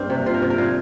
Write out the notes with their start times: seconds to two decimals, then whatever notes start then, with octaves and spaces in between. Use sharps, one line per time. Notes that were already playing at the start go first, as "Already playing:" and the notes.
Already playing: G2 A#3 C4
0.10 C3
0.26 C3 F4
0.34 A#4
0.42 C3
0.50 A#4
0.58 A#2 F4